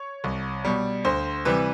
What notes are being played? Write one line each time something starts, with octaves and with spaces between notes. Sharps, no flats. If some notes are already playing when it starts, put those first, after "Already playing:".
Already playing: C#5
C2
B2 G3
D2 C5
C3 E3 G3 B4